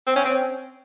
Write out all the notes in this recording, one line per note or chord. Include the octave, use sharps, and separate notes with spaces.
C4
C#4
C4